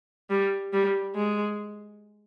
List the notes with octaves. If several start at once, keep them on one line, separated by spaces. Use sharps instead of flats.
G3
G3
G#3